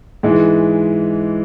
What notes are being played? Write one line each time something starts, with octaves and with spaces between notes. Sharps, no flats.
G#2 E3 G#3